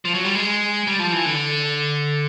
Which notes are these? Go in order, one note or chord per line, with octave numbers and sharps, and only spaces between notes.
F3
F#3
G3
G#3
G3
F3
E3
D3